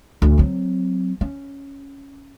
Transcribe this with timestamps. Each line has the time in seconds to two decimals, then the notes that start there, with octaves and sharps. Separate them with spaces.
0.22 D2
0.38 F#3 C4
1.21 C#4